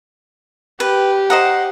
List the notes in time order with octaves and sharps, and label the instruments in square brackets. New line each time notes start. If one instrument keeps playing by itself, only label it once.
[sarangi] G4 [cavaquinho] B4
[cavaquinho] C5 D#5 A#5 [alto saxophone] F#5